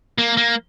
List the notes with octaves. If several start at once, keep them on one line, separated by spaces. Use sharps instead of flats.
A#3
A#3